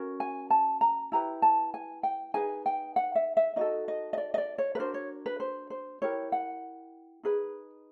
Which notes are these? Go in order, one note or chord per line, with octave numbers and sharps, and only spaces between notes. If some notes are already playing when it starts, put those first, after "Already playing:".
Already playing: C#4 F#4 A#4
G#5
A5
A#5
E4 G4 B4 A#5
A5
G#5
G5
D#4 G#4 B4 G#5
G5
F#5
E5
E5
D#4 F#4 A4 D#5
D#5
D#5
D5
D#5
D5
C#5
B4
D4 F#4 A#4 C5
C#5
B4
C5
C5
E4 G4 A#4 C#5
F#5
D#4 G#4 B4